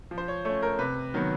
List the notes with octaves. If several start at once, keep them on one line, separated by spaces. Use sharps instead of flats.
F3
C5
C#5
A3 C#4 C#5
A#4
C3 B4
D#3 F#3 B3